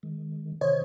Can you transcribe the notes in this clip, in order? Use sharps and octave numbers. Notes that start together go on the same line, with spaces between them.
D#3 G#3
C3 D#3 C5 C#5 D#5 G#6